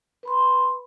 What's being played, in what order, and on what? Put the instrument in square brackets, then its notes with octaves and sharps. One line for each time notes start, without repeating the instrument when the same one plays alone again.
[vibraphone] B4 B5 C6